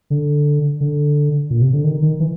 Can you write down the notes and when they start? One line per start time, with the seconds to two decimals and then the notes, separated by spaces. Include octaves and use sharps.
0.10 D3
0.81 D3
1.50 A#2
1.61 C3
1.73 D3
1.84 D#3
2.02 D#3
2.20 E3